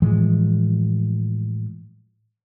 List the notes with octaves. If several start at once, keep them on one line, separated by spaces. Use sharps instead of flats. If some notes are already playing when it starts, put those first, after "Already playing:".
A2 E3 F3 G#3